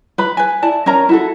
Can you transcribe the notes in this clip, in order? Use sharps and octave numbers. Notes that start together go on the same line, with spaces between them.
B4 B5
B4 G#5
E4 D5 A5
C#4 A#4 A#5
E4 F#4 A4